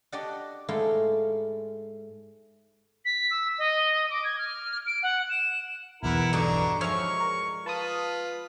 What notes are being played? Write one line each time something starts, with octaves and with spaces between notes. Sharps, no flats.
D4 F#4 G4 D5 D#5 F#5
G#2 A3 E4 F5 G5
B6
E6
D#5
D6
G#6
F6
D7
F#5
E7
B1 E2 E4 A#4 B4 F#5
G2 D3 F#3 D4 D#4 A#5
F3 G#3 C#5 E5 C#6 F6
A#4
F4 B4 A5 D#6